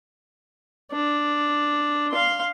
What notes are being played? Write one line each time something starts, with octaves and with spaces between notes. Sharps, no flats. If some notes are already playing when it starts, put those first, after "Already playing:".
D4
F5 C6